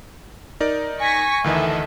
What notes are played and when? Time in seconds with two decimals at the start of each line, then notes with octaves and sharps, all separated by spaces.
0.60 D#4 A#4 D5
1.00 G#5 C#6 A#6 B6
1.44 D2 D#3 E3 A4 D#5 E5